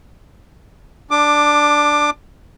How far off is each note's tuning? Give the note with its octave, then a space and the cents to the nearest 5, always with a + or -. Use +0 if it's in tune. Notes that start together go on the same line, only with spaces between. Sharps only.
D4 +0 D6 +20